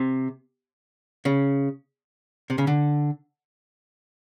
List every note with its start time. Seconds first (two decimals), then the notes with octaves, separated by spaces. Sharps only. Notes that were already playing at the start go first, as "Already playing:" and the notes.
Already playing: C3
1.25 C#3
2.50 C3
2.58 C#3
2.67 D3